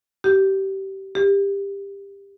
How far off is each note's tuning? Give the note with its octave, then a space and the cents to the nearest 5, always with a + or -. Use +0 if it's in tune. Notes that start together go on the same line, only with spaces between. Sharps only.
G4 -25
G4 +20